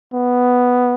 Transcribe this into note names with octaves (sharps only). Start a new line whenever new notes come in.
B3